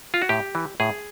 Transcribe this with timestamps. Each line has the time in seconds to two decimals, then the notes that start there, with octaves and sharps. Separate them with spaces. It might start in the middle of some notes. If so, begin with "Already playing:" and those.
0.14 F4
0.22 F#4
0.29 A2 G4
0.55 E3
0.80 A2 G#4